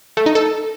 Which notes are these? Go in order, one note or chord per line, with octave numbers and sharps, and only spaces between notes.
A3
D#4
A4